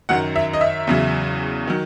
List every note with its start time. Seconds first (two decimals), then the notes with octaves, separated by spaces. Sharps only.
0.09 F#2 D#3 F#3 F#5
0.36 E5
0.53 D#5
0.61 E5
0.87 E2 C#3 F#3
1.67 D#3 F#3